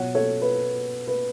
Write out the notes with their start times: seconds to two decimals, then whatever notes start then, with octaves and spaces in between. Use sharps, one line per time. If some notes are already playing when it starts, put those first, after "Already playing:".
Already playing: B2 F#3 C#5 F#5
0.15 A4 C#5
0.42 B4
1.07 B4